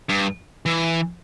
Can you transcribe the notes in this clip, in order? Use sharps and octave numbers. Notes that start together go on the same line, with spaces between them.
G2
E3